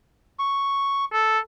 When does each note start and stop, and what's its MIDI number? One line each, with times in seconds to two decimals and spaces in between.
0.39 1.05 85
1.13 1.39 69